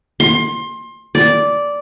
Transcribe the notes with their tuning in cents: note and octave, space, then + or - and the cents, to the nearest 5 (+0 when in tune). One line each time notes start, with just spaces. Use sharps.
C6 +25
D5 -10